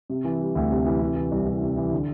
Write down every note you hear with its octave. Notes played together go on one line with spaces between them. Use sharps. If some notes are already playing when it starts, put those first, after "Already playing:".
C3
E3
G3
D2
C3
E3
C3
E3
C2
C2
C3
E3
D3